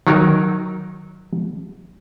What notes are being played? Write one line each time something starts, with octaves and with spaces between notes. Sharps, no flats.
D#3 F#3 D#4 A#4